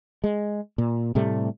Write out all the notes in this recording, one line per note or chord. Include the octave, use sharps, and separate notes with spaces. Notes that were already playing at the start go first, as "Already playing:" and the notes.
G#3
A#2
A2 C3 G3 A3